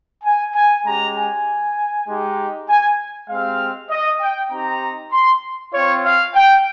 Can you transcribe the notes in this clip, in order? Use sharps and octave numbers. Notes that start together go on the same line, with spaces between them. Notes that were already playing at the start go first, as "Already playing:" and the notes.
G#5
G#5
G#3 C#4 G4 A#5
G#5
G#3 D#4 G4
G#5
G#3 C4 G4 F5
D#5
G5
C4 D#4 G4 A#5
C6
C4 F4 C#5
F5
G5